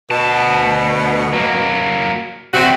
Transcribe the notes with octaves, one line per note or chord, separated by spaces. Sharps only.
D2 B2 A5
F#3 A#3
E2 C3 C4 F#4